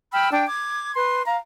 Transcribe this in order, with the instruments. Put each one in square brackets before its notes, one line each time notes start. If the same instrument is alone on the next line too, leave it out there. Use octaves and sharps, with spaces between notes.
[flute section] G5 B5 E6 F6
D4 G5
D6 G#6
B4 C6
F5 A#5